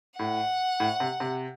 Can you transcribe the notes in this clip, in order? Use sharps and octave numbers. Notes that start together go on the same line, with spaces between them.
A2 F#5
A2
C3
C3